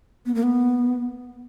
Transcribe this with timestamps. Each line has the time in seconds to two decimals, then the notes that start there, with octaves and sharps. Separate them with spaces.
0.26 B3
0.35 A#3
0.43 B3